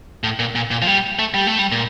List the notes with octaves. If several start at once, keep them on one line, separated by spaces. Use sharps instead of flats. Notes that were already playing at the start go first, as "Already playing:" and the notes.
A2
A#2
A#2
A#2
F3
G3
A3
G3
A3
G3
A#2